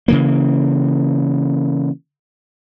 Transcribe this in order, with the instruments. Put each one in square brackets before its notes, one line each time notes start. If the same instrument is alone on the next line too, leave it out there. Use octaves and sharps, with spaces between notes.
[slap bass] C#3 E3 A#3